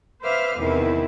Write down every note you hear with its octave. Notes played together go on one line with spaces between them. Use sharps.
B4 C5 E5 F5 D6 F6
E2 C3 D#3 E4 B4